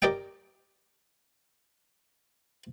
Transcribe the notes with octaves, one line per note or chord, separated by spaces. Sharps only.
G4 A#4 D5 D#5 G5